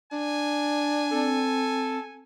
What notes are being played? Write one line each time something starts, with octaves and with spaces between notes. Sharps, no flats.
D4 G#5
C4 A4